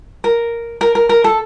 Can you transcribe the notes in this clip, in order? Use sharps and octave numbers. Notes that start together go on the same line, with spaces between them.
A#4
A#4
A#4
A#4
A4